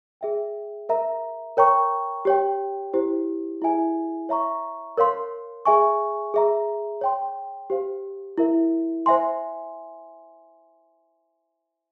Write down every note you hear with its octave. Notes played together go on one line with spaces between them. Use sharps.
G#4 E5 G5
A#4 E5 A#5
A#4 C#5 G5 A#5 C#6
G4 C#5 G5
E4 G4 C5
E4 G#4 E5 G#5
C#5 E5 A#5 C#6
A#4 C#5 F5 C6
G#4 E5 G#5 C#6
G#4 E5 A#5
C#5 G5 C6
G4 C5 F5
E4 A#4 E5
C5 E5 G#5 C6